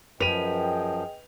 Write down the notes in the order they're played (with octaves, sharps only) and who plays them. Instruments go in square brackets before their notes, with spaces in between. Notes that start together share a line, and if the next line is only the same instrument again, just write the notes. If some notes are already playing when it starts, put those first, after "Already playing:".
[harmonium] F#2 F3 [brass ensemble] G#4 D#5 G5 [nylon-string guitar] B4 [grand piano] D#7 F7